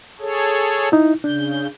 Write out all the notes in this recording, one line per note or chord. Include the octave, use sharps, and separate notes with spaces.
G#4 A4 C#5
D#4 E4
C#3 D4 G6